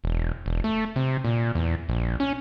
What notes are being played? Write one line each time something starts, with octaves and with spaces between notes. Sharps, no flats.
E1
E1
A3
C3
A#2
E2
A#1
C#4